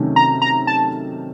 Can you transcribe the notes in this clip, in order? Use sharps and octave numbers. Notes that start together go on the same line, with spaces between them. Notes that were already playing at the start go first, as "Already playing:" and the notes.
Already playing: C3 D#3 F#3 A3 C#4
A#5
A#5
A5